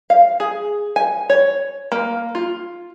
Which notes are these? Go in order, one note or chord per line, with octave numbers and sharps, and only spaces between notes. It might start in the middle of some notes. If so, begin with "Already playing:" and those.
F5
G#4
G#5
C#5
A#3
F4